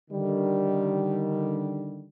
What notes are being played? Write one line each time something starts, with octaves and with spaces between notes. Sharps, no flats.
D3 D#3 G3